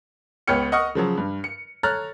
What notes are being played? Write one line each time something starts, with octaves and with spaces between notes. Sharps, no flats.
C#2 B3 C#5 G5 F6 C#7
D#5 F#5 C#6 D#6 F6
C#3 F3 F#3
G2
C#7
A4 C#5 A#5 F6 F#6 A6